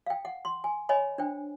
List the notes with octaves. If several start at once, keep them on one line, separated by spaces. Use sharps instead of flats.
F5 G5
F#5
C6
G#5
C#5 D#5 G#5 B5
D4 C5 G5